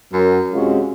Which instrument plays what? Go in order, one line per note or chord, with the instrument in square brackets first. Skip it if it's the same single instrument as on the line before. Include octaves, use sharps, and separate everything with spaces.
[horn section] F#2
C3 G#3 C#4 F4 F#4